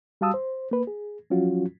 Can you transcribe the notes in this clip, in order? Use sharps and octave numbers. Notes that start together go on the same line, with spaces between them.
G3 F#4 F5 A5 D#6 E6
C5
A#3 B4
G#4
F3 F#3 C#4 F4 F#4